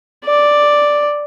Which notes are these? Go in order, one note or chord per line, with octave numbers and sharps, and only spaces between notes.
D5